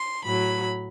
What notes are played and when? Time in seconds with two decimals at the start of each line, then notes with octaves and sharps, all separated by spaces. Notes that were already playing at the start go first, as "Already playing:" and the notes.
Already playing: C6
0.24 A2 F#3 B5